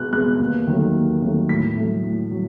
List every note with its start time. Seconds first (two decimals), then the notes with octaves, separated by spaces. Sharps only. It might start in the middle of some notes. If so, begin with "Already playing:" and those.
Already playing: B2 G#3 B3 F#6
0.13 G#3 B3 F#6
0.39 D#2
0.67 D#3 F#3 A3
0.95 D#2
1.22 D#3 F#3 A3
1.49 A2 B6
1.76 F#3 A3
2.04 A2
2.31 F#3